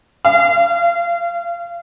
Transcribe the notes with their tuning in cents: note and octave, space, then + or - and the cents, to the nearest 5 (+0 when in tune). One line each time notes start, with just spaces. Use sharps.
F5 -30